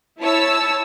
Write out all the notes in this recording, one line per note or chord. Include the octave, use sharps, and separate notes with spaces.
E4 C#5 A5 E6